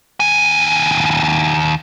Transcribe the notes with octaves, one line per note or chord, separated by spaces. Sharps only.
D#2 G#5